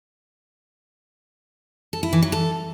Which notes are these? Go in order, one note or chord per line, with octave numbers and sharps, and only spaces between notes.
A4
E4
E3
F#3
A4